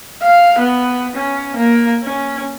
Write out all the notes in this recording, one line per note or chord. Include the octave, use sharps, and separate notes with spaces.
F5
B3
C#4
A#3
C#4